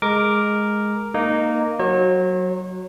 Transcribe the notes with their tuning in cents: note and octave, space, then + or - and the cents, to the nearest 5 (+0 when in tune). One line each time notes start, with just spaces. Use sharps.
G#3 +5 A#4 +0 D6 +0
A#3 +0 D#4 -15
F#3 +0 C#5 -40